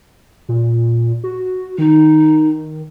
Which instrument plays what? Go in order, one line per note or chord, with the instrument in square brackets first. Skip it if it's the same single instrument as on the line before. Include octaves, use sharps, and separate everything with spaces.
[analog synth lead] A#2
F#4
[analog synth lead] D#3 [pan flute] D#4